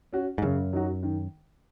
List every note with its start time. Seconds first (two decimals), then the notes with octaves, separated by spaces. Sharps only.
0.13 C#4 F#4
0.38 G#2
0.42 F#2 C#3
0.73 F#3 D#4 F#4
1.03 D#3